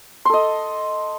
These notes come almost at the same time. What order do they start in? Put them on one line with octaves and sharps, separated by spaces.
C6 A4 D#5